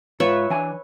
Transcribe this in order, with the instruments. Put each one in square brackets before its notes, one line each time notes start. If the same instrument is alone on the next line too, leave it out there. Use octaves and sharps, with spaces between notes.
[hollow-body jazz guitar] G#2 F4 [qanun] B4 C#5 E5
[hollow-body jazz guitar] E3 D4 G#5